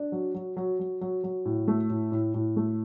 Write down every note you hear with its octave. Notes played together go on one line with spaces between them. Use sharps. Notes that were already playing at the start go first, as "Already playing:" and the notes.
Already playing: D4
F#3
F#3
F#3
F#3
F#3
F#3
A2
A3
A2
A2
A2
A3